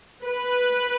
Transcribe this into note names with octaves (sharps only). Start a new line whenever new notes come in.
B4